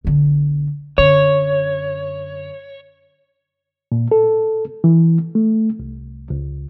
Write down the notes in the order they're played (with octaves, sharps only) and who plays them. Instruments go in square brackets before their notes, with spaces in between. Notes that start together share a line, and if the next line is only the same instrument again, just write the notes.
[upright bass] B1 D3
[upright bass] F#2 D3 [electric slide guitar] C#5
[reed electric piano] A#2
A4
E3
A3
C2
C#2